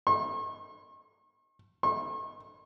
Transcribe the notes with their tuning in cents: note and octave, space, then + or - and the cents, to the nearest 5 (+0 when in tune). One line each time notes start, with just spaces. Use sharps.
C#6 -45
C#6 -45